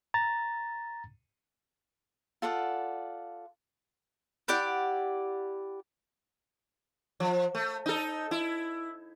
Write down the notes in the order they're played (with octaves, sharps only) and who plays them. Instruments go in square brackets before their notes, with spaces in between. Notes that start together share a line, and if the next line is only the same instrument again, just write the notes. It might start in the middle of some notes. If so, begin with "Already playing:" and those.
[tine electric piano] A#5 A6
[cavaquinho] F4 A4 D5 F#5
[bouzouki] E4 G4 D5 F#5
[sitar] F3
A3
D#4 A4
E4